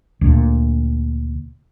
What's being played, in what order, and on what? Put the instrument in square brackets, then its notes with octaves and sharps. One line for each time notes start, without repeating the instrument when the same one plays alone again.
[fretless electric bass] D2 A#2